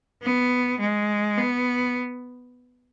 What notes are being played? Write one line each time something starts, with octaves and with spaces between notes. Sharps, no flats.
B3
G#3
B3